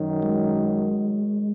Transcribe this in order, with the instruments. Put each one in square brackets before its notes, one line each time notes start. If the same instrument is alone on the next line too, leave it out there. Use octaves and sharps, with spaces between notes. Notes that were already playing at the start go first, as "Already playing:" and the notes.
Already playing: [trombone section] F#2 D#3 F#3
[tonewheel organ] G#3